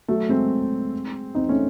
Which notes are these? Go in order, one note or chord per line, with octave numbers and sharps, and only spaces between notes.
F#3 A3
G#3 C4
C4 D#4
A3 C#4